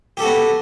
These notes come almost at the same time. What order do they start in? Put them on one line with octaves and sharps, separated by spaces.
G4 A4 F#4 B3